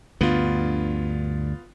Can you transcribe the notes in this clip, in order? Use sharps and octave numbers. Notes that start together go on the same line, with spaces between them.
D2 G2 D3 B3 F4